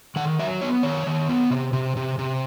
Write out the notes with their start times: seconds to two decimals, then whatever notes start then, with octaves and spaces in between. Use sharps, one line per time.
0.16 D#3 F#5
0.39 F#3 E5
0.61 B3 C#5
0.83 D#3 C#5
1.07 D#3
1.29 B3
1.50 C3
1.73 C3
1.97 C3
2.19 C3